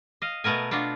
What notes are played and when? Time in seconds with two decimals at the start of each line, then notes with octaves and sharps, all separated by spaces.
0.22 D#5 F5
0.44 B2 A3 B3 A#4 G#5
0.71 B3 D4 F4 F#4